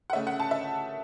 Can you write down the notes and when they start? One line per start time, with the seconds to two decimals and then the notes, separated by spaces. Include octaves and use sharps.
0.10 F#5
0.13 C#3 A3 C#4 E5
0.27 F#5
0.40 A5
0.51 E5